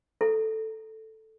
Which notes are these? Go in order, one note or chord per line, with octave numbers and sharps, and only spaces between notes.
E4 A4